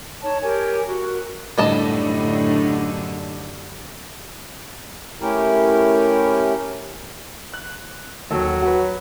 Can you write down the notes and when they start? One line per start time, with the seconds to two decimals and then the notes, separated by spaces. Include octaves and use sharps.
0.22 D#4 C#5 A5
0.42 G4 A#4 C#5 G#5
0.86 F#4 A#4
1.58 F#2 A2 D3 G3 D4 D#4 D#5 A5
5.21 A3 C#4 E4 G4 A#4
7.54 F#6
8.31 D#2 F#3 A4
8.62 F#4 B4